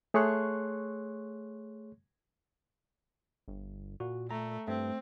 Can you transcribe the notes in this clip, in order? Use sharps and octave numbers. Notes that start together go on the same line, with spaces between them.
A3 G#4 C#5 C6 C#6 F#6
G1
A#2 F#4
A3 A#5
G2 A3 C4